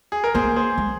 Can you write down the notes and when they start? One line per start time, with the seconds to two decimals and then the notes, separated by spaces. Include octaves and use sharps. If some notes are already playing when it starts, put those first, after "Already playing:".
0.12 G#4
0.24 A#4
0.34 A#3 G#4 C5
0.56 G#4 C5
0.78 G#3